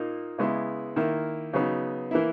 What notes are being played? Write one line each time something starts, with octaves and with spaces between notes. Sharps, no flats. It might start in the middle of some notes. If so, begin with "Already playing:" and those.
Already playing: A#2 A#3 D#4
C#3 G#3 B3 E4
D#3 A#3 E4
C#3 F#3 B3 D#4
E3 A#3 E4